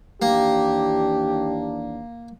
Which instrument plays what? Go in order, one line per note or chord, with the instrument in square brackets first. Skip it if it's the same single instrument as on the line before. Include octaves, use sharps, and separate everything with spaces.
[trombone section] D#2 E3 D4 [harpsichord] A#3 [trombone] G4